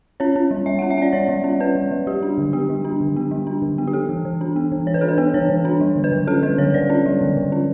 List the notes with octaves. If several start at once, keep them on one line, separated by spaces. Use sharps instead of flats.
C#4 C#5
C#4
G3
G3 E5
F#5
C#4
E5
C#4 D5
G3 C#5
G3
C#4
C#4 B4
G3
G3
G3 G4
D4
D3
B3 G4
G3
D4
D3
B3
G3
D4
D3
B3
G4
B3 A4
E3
E3
D4
B3
E3
E3 C#5
B4
D4 A4
B4
B3
E3 C#5
E3
D4
G3
D3
B4
D3
C#4 A4
G3 B4
D3 C#5
D3 D5
C#4
G3
D3
D3
C#4